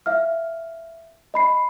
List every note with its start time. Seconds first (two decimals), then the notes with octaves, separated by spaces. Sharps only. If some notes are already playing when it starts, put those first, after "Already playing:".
0.06 E5 F5 F6
1.34 D#5 B5 C7